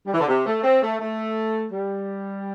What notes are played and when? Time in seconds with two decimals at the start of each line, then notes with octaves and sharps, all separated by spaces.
0.06 G3
0.13 E3
0.20 D3
0.27 C3
0.46 A3
0.63 C4
0.82 A3
1.00 A3
1.72 G3